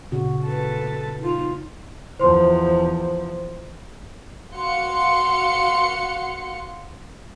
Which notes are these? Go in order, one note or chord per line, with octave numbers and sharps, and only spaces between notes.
A#2 C#3 F#4
A4 B4
D#4 F4
E2 F3 C5 C6
F#4 F5 C6 C#7